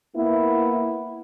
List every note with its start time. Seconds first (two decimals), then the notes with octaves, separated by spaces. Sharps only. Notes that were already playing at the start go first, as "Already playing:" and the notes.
0.16 A#3 B3 E4